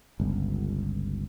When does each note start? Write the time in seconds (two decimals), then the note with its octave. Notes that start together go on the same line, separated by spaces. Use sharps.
0.20 G1 C#2